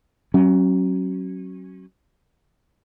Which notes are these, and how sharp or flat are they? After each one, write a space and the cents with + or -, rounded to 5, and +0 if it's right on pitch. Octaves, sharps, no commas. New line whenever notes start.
F#3 +20 C#4 -25